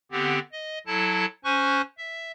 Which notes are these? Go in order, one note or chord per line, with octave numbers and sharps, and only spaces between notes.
D3 B3 C4 G4
D#5
F#3 E4 A4 A5
C#4 C5 G#5 C#6 F#6
E5